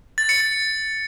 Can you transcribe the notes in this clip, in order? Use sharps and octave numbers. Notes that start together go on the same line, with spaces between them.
A6
C#7
A6